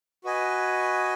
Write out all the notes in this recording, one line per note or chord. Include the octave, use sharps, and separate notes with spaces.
F#4 B4 D#5 G#5